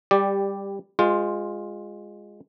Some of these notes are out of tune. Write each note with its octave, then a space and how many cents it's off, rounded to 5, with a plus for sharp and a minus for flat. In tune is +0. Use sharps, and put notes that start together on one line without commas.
G3 +15 G4 +0 D5 +0
G#3 -15 F4 +10 C5 +0